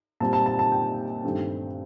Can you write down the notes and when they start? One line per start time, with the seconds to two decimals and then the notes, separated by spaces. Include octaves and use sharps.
0.20 A#2 G3 C4 A5
0.33 A5
0.46 A5
0.59 A5
0.72 G5
1.24 G2 D#3 A3 C4